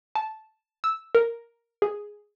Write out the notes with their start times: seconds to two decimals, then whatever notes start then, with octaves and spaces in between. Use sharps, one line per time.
0.15 A5
0.84 E6
1.15 A#4
1.82 G#4